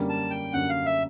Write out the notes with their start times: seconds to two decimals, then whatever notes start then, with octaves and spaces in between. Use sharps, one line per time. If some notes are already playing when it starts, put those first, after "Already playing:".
Already playing: F#2 D3 G3 A#3 C#4
0.09 A5
0.30 G5
0.53 F#2 D3 G3 A#3 C#4 F#5
0.69 F5
0.86 E5